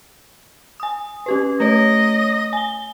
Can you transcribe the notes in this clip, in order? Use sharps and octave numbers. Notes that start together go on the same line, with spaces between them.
G#5 D#6
C#4 G4 B4
A3 C#5 D#5
G#5 G7